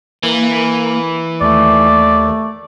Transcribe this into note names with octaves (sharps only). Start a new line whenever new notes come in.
E3 A#3
D#2 A3 D5